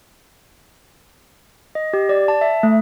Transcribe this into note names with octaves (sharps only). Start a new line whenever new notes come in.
D#5
G4
D5
A5
E5
A3